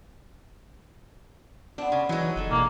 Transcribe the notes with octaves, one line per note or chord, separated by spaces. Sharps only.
B3 C4 D4
C#3
E3 F#3 G#3 E4
D#4
F#1 A4 G5 G#5
B2 A#3 D4 E4